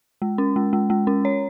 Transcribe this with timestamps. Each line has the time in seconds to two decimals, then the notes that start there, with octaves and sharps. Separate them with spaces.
0.22 G#3
0.38 C#4
0.56 G#3
0.73 G#3
0.90 G#3
1.07 C#4
1.25 C#5